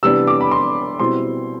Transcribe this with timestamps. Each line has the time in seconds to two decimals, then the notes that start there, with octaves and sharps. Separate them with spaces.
0.03 C3 E3 G3 B3 D4 E6
0.27 D6
0.41 B5
0.51 C6
0.99 B2 G3 C4 E4 C6